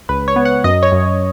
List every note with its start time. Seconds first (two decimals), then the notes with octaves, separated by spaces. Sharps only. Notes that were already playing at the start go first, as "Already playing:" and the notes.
0.09 C#2 B4
0.28 C#5
0.36 B3
0.45 F#5
0.64 F#2 D#5
0.83 C#5
0.92 F#2